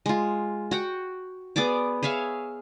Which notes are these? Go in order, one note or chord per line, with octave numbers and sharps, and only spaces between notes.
G#3 F4
F#4 F#5 G5
B3 G#4 D5 D6
G#4 C#5 E5 F5